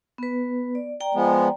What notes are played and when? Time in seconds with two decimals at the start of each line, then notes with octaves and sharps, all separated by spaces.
0.18 B3 B4
0.75 D5
1.00 D5 G5 A#5
1.15 F3 G#3 B3